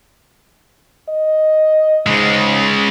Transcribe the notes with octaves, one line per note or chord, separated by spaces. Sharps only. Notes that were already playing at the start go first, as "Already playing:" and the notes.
D#5
G#2 C#3 G#3